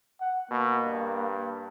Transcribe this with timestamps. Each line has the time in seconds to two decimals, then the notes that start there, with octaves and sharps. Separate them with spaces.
0.21 F#5
0.51 B2 A#3
0.85 G2